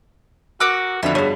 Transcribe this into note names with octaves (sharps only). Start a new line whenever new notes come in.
F#4 A#4 D6 E6 F#6
F2 B2 D3 D4 F4 E5
G2 B3 F#4 G#4 C#5